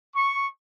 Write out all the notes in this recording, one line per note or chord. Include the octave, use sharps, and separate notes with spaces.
C#6